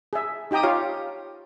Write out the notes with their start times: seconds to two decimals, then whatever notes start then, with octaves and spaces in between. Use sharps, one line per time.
0.13 G#4 E5
0.51 D#4 G4 G5 A#5 D#6
0.63 F4 G4 C#5 F5